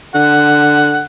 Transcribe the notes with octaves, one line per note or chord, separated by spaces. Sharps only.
D3 F#5